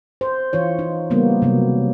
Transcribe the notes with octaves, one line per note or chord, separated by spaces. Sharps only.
C5
E3 F4 C#5
D#4
C#3 G3 A#3 B3
C3 F#3 B3